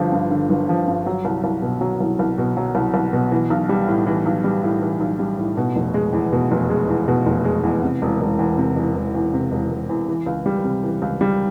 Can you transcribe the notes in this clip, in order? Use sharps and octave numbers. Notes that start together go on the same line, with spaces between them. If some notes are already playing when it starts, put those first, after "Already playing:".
Already playing: G1 G2 D3 F3
G2
D3
G1
F3
G2
F#3
C2
C2
B2
F#3
C2
C2
B2
F#3
C2
C2
B2
E3
B1
G3
A2
E3
B1
G3
A2
E3
B1
G3
A2
B2
F1
G#3
E2
B2
F1
G#3
E2
B2
F1
G#3
E2
C3
E1
E1
E2
C3
E1
E1
E2
C3
E1
E1
E2
E3
C#2
G3
C3
E3
C#2
G3